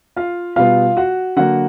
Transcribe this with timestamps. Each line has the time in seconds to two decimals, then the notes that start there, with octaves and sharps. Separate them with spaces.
0.16 F4 F5
0.56 B2 G3 B3 F4 F5
0.97 F#4 F#5
1.36 D3 F#3 A#3 F#4 F#5